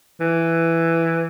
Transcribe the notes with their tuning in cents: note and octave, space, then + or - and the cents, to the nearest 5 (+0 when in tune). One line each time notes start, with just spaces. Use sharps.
E3 +10